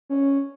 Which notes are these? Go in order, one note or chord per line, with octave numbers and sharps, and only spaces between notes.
C#4